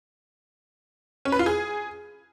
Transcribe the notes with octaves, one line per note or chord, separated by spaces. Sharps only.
C#4
B4
F4
G#4